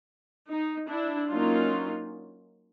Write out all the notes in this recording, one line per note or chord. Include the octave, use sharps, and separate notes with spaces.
D#4
D4 E4
F#3 A#3 C#4 D#4 F4